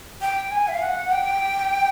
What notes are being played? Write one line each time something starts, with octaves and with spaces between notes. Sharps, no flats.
G5
G#5
E5
F5
F#5
G5